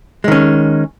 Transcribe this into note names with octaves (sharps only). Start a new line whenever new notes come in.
D#3 G#3 C#4